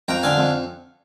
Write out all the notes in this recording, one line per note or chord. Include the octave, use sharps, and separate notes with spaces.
F2 G5 A#5
D3 F5 G#5
F2